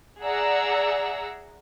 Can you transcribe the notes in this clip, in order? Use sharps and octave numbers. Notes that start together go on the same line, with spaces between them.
G#4 D5 E5 F#5 A#5 E6